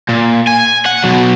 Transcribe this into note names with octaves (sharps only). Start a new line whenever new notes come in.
A#2
G#5
F#5
B2 F#3